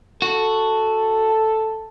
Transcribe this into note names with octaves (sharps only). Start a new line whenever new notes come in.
F#4 A4